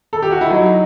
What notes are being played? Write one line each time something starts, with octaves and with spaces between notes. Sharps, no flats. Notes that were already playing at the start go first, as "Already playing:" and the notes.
A4
G4
F#4
E4
F#3 D#4